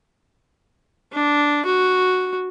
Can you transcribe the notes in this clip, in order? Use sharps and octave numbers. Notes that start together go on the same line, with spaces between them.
D4
F#4